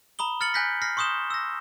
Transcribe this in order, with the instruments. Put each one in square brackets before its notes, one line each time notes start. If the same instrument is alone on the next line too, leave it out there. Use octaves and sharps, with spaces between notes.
[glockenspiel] A#5 B5 D#6 G7
F6 A6 C#7 F#7
G#5 F#6 G6 A#6 B6
F6 A#6 C7
C6 C#6 D#6 G6 E7 G7
E6 A#6